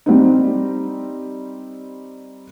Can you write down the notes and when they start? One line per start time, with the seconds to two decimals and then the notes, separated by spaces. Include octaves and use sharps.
0.06 G3 C4 D#4